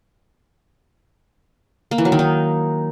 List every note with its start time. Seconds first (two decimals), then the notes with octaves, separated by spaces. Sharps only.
1.91 A#3
1.98 E3
2.05 F#3
2.12 D#3
2.19 D#4